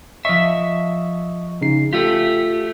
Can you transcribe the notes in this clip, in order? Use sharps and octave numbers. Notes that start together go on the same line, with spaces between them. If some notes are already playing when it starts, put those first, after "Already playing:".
F3 D#5 E5 C#6
C#3 D#4 C7
A3 F4 G4